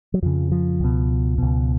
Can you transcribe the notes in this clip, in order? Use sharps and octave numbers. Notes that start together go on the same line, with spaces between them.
F#3
F2 C#3 F3
F3
C#2 B2
C#2 B2